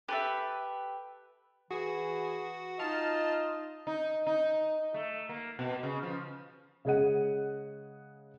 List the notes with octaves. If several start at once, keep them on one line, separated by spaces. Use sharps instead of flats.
G4 A4 B4 E5
E3 F#4 G#4
D#4 F4 D#5 A5 F6
D#4
D#4
A3
A#3
B2
C#3
F3
C#3 G#3 G#4 D#5 F#5 D#7